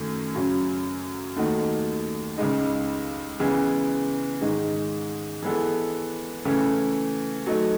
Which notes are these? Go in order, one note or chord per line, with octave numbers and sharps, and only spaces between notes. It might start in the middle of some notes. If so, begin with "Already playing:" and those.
Already playing: F#2 D#3 A3 C#4
F#2 C#3 F#3 C#4
D#2 D#3 A3 D#4 F#4
C#2 C#3 G#3 D#4
C#3 E3 G#3 B3
G#2 D#3 G#3 D#4
E3 G#3 B3 E4 A4
C#3 E3 A3 C#4
F#3 A3 D#4